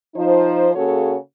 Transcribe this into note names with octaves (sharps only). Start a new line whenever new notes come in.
F3 D#4 C5
C#3 A#3 F#4 G#4 A4 C#5